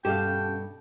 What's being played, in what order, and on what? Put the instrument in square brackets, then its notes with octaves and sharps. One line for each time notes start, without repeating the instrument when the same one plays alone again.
[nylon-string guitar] G2 B2 A4 [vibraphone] C#4 [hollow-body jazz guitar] G4 D#5 F5 [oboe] G5